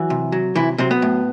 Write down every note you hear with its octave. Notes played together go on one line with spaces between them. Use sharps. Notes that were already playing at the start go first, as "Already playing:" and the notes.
Already playing: E3 F#3 F#4
C3
F#3
C3 E3 E4
C3 F#3 C4
B3
A2